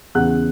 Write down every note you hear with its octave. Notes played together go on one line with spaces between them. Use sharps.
E2 C#3 E3 F#5 F#6